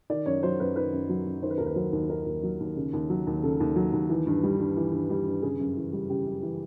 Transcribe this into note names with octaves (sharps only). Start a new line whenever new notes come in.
D#3 D5
F#2 C#5
F#3 C5
F#2 B4
D#3 B4
F#2
F#3
F#2
D#3 C5
B4
D#2 A#4
B4
F#3 C5
D#2
D#3 A#4
D#2
F#3
D#2
C#3
D#2
F#3
D#2
C#3 A4
D#2
F#3
D#2
E3
G2
G3
G2
E3
G2
G3
G2
C#3 G#4
F#2
E3
G3
C#3 G4
F#2
E3